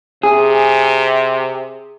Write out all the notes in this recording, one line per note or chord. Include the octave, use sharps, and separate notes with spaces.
C3 G#4